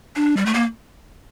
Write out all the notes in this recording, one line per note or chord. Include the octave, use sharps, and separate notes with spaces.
D4
G3
A3
A#3